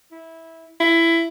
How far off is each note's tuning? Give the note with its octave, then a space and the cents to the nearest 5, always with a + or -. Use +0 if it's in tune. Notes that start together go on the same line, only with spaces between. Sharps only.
E4 -15
E4 +15